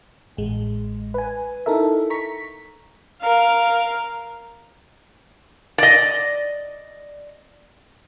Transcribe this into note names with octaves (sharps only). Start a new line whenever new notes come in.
A1 G#3
B4 G#5
D#4 E4 A4 A#4 E5
A#5 C#6 B6
A#4 F5
D5 D#5